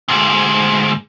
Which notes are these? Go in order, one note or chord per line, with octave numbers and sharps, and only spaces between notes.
D2 G#2